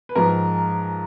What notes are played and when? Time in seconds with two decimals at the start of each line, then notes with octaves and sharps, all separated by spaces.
0.09 B4
0.15 G#2 F3 A#4